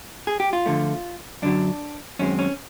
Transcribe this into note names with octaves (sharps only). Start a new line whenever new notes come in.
G#4
G4
F4
D3 F3 A3
F#2 D3 F#3 D4
F#2 D#3 G#3 C4 C#4
C#4